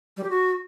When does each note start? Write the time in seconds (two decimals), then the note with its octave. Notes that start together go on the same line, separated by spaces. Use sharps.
0.17 G3
0.23 G4
0.30 F#4